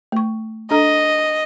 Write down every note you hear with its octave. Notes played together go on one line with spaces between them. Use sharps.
A3 C#6
D4 A4 D#5 A#5